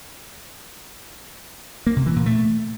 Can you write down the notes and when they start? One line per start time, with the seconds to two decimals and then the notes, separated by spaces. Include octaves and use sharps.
1.87 A#3
1.96 C3
2.06 E3
2.16 A#2
2.26 A3